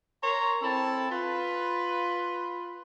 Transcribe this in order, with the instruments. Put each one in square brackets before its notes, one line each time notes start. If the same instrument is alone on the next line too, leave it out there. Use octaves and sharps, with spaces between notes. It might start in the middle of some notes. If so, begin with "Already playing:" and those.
[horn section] A#4 C#5 A#5 C6
C4 E4 A4 A5
F4 B4